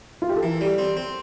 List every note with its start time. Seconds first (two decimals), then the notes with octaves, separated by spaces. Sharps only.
0.22 F4
0.29 G4
0.36 A4
0.43 E3 A#4
0.61 G3
0.78 C4
0.97 C4